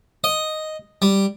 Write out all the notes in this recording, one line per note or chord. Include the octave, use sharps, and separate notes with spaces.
D#5
G3